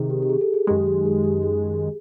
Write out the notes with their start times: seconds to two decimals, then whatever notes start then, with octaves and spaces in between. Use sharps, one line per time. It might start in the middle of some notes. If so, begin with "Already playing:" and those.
Already playing: C3 D#3 G#4
0.10 G4
0.23 G4
0.29 G#4
0.41 A4
0.54 G#4
0.67 F#2 D#3 G#3 G4
0.86 G4
1.05 G#4
1.24 G4
1.43 G#4